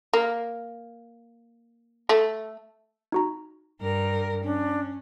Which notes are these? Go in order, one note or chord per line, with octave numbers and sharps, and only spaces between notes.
A#3
A3
D#4 F#4 A#5
G2 A#4
C#4 D4